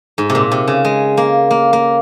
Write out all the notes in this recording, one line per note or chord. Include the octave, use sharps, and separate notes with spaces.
G#2
C3
A#2
C3
C#3
G#3
A#3
A#3
A#3